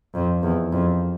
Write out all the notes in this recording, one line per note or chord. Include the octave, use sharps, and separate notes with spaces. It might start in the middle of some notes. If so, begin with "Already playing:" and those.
F2
E2
F2